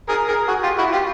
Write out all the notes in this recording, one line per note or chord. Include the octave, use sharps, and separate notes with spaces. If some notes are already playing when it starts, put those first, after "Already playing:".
G#4 A#4
G#4 A#4
F#4 G#4
F4 G4
E4 F#4
F4 G4